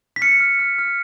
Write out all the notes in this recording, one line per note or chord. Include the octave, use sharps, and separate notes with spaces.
B6
F6 C#7
F6
F6
F6